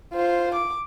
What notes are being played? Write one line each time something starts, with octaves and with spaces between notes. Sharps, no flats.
F4 C5
D6